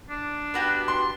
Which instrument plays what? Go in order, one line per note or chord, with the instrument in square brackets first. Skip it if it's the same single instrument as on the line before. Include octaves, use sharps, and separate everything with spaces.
[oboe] D4
[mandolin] B3 F#4 G4
[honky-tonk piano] C6